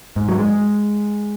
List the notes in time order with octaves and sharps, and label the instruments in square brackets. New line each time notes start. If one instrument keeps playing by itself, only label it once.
[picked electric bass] G#2
F#3
G#3